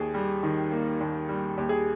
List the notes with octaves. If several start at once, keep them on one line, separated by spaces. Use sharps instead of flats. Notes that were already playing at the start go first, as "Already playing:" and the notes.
Already playing: D#2 G#4
G3
D#3
A#3
D#2
G3
D#2 G4
G#4